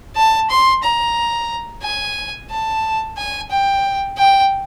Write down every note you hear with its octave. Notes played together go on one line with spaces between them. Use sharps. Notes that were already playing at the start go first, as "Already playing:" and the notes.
A5
C6
A#5
G#5
A5
G#5
G5
G5